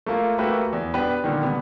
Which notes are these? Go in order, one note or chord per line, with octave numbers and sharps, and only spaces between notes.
A3 A#3 F4
A3 A#3 F#4 G4 B4 E5
E2
B3 D4 G4 B4
A#2 D3 D#3
C3 G3 B3